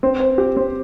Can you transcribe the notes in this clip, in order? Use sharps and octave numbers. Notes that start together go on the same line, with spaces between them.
C4
C5
G4
C4